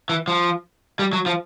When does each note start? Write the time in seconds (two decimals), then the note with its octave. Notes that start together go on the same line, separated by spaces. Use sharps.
0.09 E3
0.28 F3
0.99 G3
1.13 F#3
1.26 F3